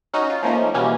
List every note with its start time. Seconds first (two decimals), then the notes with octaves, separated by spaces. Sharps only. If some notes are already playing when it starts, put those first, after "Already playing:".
0.14 C#4 D#4 F#4
0.30 F4
0.43 F3 A3 A#3 C#4 D#4
0.74 B2 E3 G3 A#3 C#4